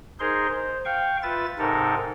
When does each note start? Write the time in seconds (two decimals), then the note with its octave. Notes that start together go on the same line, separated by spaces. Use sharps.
0.20 D#4 G#4 A#4 C5 C6
0.49 C5
0.85 F5 G5 C#6
1.23 F4 B4 E5 A6
1.59 G#2 C3 D#4 A4 A#4